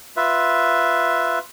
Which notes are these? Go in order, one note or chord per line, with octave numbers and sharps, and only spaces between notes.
F4 B4 E5